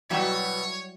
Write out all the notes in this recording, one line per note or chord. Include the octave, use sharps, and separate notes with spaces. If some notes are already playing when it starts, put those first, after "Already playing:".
B2 F#3 G3 E4 F#4 C#5 E5